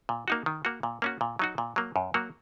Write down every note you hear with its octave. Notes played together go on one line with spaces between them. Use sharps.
A#2
A#3 D#4 F#4
D#3
A#3 F#4
A#2
A#3 C#4 F#4
A#2
F#3 D#4 F#4
A#2
F#3 A#3
F#2
F#3 A#3 F#4